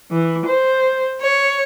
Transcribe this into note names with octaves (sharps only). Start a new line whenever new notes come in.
E3
C5
C#5